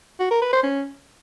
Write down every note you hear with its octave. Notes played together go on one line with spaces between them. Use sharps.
F#4
A#4
B4
C5
C#4